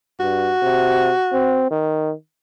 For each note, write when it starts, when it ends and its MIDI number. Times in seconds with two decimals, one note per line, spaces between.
0.20 0.52 43
0.20 1.68 66
0.62 1.12 48
1.33 1.70 60
1.71 2.12 51